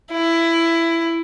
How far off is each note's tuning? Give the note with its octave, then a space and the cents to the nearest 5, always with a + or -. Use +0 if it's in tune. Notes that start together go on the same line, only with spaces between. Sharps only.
E4 +15